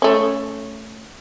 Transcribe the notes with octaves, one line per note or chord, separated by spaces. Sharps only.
A3 C#4